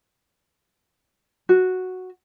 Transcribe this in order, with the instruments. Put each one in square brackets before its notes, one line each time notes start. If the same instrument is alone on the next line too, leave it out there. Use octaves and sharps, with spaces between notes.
[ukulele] F#4